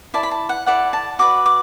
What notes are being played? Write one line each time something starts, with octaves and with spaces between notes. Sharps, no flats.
E4 D5 A5
B5
A5
F#5
E4 A4 D5 F#5
A5
F#4 B4 D5 D6
D6